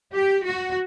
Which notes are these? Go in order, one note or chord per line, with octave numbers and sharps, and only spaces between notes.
G4
F#4